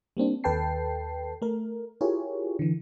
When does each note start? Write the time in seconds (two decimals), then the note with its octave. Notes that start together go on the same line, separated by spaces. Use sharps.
0.17 G3 A#3 C4 D4
0.44 D#2 A4 B4 G5 A5 C7
1.42 A3 A#4
2.01 E4 F4 G4 G#4 A#4 C#5
2.59 D3 E3